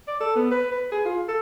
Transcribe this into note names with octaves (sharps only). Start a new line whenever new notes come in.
D5
A4
B3
B4
B4
G#4
F4
A4